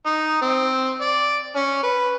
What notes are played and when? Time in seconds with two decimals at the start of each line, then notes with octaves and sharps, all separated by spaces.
0.06 D#4
0.42 C4
1.01 D5
1.56 C#4
1.83 B4